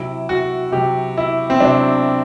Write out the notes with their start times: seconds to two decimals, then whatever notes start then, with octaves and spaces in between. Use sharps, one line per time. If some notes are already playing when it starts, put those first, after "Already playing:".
Already playing: C3 F#3 E4
0.29 F#4
0.72 C3 F#3 G4
1.18 E4
1.50 C4
1.60 F#3 D4
1.66 C3